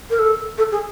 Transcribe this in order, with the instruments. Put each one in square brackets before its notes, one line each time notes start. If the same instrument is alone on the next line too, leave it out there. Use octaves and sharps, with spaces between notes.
[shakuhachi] A#4
A4
A4
G#4